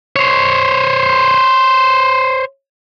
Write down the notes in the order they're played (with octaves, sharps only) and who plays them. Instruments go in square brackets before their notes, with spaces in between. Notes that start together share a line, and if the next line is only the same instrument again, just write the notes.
[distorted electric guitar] C5 C#5